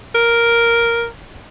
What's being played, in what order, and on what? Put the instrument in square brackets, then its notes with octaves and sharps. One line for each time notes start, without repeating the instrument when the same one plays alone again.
[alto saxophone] A#4